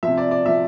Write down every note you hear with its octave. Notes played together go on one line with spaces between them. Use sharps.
C3 F3 E5
D5
D5
C3 F3 E5